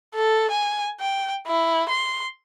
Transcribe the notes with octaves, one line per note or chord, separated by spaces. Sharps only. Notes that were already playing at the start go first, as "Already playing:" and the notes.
A4
G#5
G5
E4
C6